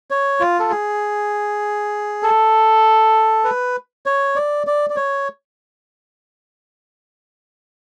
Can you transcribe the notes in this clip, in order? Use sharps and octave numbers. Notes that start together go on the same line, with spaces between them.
C#5
F4
A4
G#4
A4
B4
C#5
D5
D5
D5
C#5